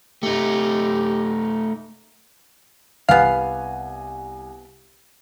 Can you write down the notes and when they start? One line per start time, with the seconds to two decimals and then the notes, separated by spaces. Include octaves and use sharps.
0.23 A3 D#4 G4
3.09 C2 B3 F5 F#5 G#5